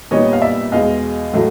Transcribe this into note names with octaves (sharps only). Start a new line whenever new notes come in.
A#2 G3 B3 D#4 C#5 D#5
F5
D5 E5
E2 B2 G#3 D#5 F5
A2 F#3 A3